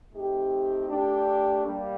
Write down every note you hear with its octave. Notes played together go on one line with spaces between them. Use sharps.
A3 C4 D#4 G4
A3 D4 G4
G3 A#3